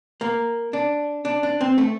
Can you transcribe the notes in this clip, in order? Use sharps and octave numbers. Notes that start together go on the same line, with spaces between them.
A#3
D4
D4
D4
C4
A3